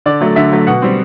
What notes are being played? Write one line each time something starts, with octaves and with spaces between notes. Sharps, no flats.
D3 D5
F#3 A3
D3 E5
F#3 A3
B2 F#5
G3 C4